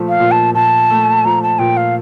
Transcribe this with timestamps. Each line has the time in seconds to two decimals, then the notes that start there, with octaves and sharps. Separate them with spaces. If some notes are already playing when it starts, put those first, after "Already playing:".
Already playing: A#2 F3 A3
0.09 F5
0.20 A#2
0.31 A5
0.54 A#2 A5
0.90 A3
1.25 F3 A#5
1.42 A5
1.59 A#2 G5
1.77 F5